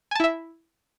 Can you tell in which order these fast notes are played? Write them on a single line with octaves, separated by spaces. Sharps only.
G#5 A5 E4 E5